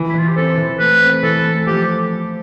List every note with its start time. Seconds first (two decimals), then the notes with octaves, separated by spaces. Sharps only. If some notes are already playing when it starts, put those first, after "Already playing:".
Already playing: E3
0.09 E4
0.14 E3 F4
0.27 G4
0.36 C4 A4
0.58 E3
0.79 A3 B4
1.01 C4
1.23 E3 A4
1.45 A3
1.67 F3 G4